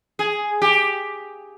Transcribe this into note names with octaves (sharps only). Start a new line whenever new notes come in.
G#4
G4